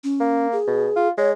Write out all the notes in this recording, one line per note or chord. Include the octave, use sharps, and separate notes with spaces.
C#4
A#3
G#4
B2
F4
G#3 C#5